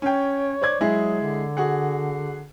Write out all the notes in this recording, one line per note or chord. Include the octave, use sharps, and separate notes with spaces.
C#4 C#5 G5
C5 D5 G#6
F#3 G#3 E4 G#4
D3
F#4 G#4 F#5